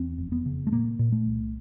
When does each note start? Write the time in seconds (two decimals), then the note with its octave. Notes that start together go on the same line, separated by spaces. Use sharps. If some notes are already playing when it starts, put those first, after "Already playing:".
Already playing: E2 C4
0.18 F1
0.32 B3
0.46 C#3
0.67 A3
0.72 A#2 A#3
0.99 A#2
1.12 A3
1.27 C2